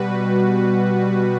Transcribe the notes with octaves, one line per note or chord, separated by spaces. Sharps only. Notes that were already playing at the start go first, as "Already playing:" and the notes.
Already playing: B2 G3 F#4 B4